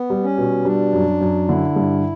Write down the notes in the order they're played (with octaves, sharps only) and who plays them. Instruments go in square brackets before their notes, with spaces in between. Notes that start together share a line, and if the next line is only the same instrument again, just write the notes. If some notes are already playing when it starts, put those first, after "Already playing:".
Already playing: [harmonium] B3
[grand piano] G3
[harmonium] C#4
[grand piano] B2
[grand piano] G3 [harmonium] D4
[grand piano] F#2
F#2
[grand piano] D3 [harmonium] E4
[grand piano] G2